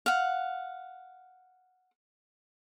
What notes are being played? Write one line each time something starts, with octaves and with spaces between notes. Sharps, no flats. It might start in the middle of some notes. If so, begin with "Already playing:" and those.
F5 F#5